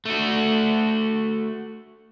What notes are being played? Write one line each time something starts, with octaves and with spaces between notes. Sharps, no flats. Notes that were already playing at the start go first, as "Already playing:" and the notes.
A3 F#4